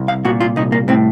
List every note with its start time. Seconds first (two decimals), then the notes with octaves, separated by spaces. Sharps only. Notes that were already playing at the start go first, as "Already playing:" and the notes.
Already playing: C2
0.08 F5
0.25 A#2 F#4
0.40 F4
0.56 C2 D#4
0.72 A#3
0.88 A2 C4